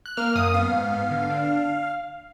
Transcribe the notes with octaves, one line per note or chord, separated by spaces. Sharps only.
F#6
A#3 F6
F#2 D#6
B3 F5
G#2
B3
D3
D4